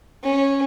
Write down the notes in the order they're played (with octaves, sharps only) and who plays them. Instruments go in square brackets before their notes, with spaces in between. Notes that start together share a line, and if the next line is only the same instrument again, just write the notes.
[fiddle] C#4